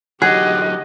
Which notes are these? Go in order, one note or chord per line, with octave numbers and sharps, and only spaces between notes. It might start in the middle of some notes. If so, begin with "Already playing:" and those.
D3 F#3 D#4 G4 G#4 D#5 F#5